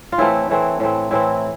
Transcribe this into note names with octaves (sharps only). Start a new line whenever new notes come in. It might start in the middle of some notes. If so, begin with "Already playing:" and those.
F4
A2 E3 A3 C4 E4
A2 E3 A3 C4
A2 E3 A3 C4
A2 E3 A3 C4 E4